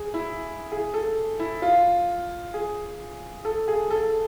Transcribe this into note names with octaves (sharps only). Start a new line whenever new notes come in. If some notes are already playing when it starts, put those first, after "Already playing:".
Already playing: G#4
E4
G#4
A4
E4
F4
G#4
A4
G#4
A4